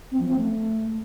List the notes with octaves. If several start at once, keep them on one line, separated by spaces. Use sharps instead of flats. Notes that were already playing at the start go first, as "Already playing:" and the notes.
C4
F3
C4
A3